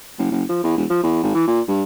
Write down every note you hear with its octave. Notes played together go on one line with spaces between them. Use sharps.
F#1
F#1
F3
E2
E1
F3
E2
G#1
E3
A#2
G2